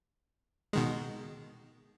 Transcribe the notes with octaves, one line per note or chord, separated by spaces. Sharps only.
B2 D#3 G#3